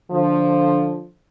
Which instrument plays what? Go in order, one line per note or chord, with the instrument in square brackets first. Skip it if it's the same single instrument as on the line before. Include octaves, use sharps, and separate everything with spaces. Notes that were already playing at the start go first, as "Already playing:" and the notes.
[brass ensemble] D3 F3